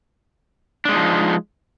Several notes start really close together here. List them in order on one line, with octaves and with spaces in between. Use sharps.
D4 G#3 D#4 F3